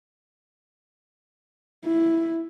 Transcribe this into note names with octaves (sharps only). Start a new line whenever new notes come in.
E4